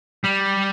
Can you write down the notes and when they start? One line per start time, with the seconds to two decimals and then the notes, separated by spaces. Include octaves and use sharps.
0.24 G3